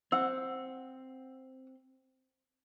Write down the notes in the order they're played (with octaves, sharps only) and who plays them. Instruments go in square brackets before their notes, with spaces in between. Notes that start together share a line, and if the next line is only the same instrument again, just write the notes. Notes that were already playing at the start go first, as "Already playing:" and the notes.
[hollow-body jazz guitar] C4 [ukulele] F#5 [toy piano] E6